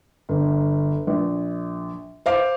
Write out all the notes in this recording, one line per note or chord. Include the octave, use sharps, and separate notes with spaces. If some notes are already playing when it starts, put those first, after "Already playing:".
G1
A#1
C5 F5 D6